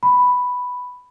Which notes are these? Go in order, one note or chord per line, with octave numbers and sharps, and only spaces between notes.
B5